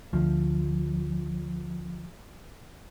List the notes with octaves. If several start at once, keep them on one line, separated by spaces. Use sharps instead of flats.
D2 F3